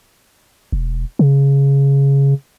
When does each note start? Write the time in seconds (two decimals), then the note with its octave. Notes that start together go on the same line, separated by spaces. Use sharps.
0.72 E1
1.19 C#3